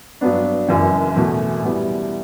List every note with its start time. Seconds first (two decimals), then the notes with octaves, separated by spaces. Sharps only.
0.21 G2 F#3 B3 D4
0.68 F#1 F#2 E3
1.16 E2 B2 A3
1.63 B2 G3 B3 E4 G4